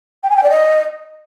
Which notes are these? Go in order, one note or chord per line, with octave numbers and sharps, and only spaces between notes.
G5
G#5
G5
D5
D#5